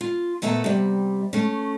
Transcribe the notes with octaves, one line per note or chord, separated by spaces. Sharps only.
F4
A#2 A3 B3 E5 A#5
C3 G3
A3 C#4